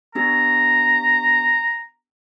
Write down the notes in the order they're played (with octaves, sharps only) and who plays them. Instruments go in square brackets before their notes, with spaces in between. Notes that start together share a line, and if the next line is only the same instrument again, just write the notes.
[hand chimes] B3 D4 G4 [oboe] A#5